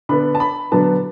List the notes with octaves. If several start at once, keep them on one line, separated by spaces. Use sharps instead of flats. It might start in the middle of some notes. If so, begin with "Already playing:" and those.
D3 B3 D4 B5
A5
B5
D3 F#3 B3 A5